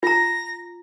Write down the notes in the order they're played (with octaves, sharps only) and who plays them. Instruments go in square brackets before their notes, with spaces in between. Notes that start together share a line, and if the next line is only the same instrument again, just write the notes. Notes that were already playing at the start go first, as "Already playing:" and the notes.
[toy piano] F4 A#5 [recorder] A#6